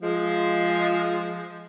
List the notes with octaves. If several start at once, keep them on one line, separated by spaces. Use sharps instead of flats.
F3 G#3